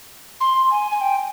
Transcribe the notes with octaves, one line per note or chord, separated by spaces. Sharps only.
C6
G#5
G#5
G5